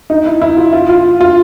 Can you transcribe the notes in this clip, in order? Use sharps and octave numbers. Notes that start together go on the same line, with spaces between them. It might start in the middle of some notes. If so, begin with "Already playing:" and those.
D#4
E4
E4
F4
F4
F4
F4